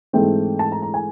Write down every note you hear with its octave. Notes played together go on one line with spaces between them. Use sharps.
G#2 E3 A3 C4 G5
A5
A#5
A#5
G#5